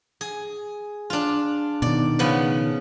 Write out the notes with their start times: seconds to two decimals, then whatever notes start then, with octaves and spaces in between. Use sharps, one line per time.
0.21 G#4
1.10 D4 F4
1.82 B2 D#3 D5
2.19 C#3 F3 B3